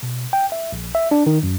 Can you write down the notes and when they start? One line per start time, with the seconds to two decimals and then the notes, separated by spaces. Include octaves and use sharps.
0.03 B2
0.33 G5
0.52 E5
0.72 A#1
0.95 E5
1.11 D4
1.26 D#3
1.43 F#2